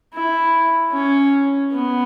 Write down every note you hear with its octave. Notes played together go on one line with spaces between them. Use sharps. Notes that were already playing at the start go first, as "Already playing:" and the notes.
E4
C#4
B3